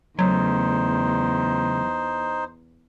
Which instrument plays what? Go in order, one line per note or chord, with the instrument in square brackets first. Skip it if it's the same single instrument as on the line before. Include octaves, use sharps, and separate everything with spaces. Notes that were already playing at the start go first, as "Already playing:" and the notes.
[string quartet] E2 [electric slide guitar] C#3 A3 [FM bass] F#3 [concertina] D#4 C5